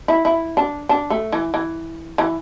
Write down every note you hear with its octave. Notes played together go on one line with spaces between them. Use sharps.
E4
E4
D4
D4
A3
E3
E3
E3